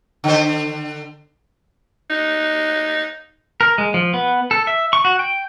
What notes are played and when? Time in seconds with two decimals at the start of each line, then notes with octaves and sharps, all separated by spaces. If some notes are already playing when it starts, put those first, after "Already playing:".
0.24 D3 C5
2.10 D#4
3.61 A#4
3.78 G#3
3.94 F3
4.14 B3
4.51 A4
4.67 E5
4.93 C#6
5.05 F#4
5.19 G5